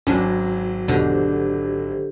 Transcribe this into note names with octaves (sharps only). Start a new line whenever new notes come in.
G#1 F#3 C#4 D4
E2 B2 D3 G4 C5